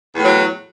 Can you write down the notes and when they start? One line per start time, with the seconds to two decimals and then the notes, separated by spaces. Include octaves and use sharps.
0.13 E2
0.18 A2
0.22 F#3